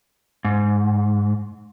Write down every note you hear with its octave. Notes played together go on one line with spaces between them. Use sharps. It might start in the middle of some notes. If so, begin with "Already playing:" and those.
G#2